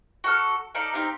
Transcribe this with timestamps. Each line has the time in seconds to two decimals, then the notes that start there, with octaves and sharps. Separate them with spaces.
0.24 F#4 A4 F6
0.75 D#4 A4 D5 F5
0.94 C4 D#4 G4 F5